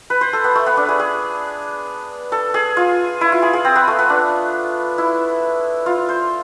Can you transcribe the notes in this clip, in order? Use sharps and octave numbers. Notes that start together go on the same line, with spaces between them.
B4
C5
A4
B3
A3
B3
D4
G#4
G#4
A4
G#4
F4
E4
F4
G#4
G#4
C4
B3
A3
B3
D4
E4
F4
C5